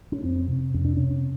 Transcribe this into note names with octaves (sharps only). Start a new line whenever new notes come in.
C#4
F2 C4
C3
F2 C#4
D4
C3 C#4